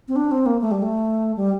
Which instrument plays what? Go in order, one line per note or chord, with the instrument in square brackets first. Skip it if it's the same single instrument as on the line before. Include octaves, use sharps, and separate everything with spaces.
[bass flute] C4
D4
C4
A#3
A3
G3
A3
G3